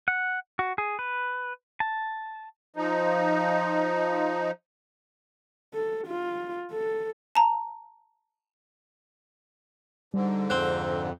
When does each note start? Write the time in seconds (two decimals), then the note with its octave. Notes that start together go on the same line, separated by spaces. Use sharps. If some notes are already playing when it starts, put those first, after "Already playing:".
0.08 F#5
0.59 F#4
0.78 G#4
0.99 B4
1.80 A5
2.76 F3 D#4
5.74 A4
6.07 F4
6.71 A4
7.35 A5 A#5
10.14 G#2 D3 G3
10.50 F2 C4 F#6